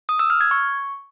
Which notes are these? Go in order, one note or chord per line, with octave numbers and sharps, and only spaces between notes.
D#6
E6
F6
G#6
C#6